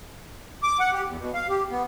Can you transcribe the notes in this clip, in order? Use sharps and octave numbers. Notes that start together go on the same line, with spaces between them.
D6
F#5
G4
E2
B2
F5
G4
B3